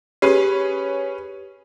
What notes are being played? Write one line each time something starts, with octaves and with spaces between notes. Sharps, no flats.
C#4 G4 G#4 B4